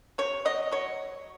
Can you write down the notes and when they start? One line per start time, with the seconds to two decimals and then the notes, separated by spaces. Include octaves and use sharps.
0.18 C3 C#5
0.45 F#3 D#5
0.71 F#3 C#5